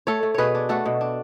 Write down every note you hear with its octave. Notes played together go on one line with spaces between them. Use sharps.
A3 A4 C#5
A3
B2 G#4 B4 C#5
D4
A3 F#4 A4
B2
D4